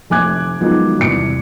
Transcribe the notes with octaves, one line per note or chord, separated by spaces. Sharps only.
F1 A3 G#5 D6 F#6 G#6
D#3 F3 F#3 G#3 B3
E2 G2 C3 C#7 D7